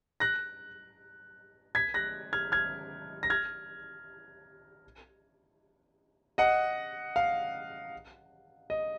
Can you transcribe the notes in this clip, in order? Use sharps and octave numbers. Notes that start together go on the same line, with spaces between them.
F#6 A#6
G#6 B6
F#6 A#6
F6 G#6
F6 G#6
A#6
F6 G#6
D#5 F#5
F5
D#5